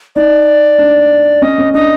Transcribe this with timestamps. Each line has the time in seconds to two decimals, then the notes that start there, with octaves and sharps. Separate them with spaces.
0.16 D#4 D5
0.78 D4
1.42 C#4 D#5
1.58 C#4
1.74 D4 D#5